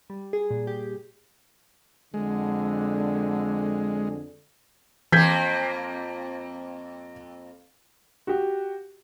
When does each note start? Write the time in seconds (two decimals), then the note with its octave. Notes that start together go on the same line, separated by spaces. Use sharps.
0.10 G3
0.33 G#4
0.51 A#2
0.67 G4
2.14 F2 D3 G#3
5.12 F2 E3 A#3 G6 G#6 B6
8.27 F#4 G4